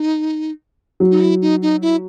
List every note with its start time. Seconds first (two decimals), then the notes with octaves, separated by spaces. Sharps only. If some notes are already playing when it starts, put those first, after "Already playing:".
Already playing: D#4
1.00 F#3
1.11 D#4
1.21 E4
1.41 D#4
1.62 D#4
1.82 E4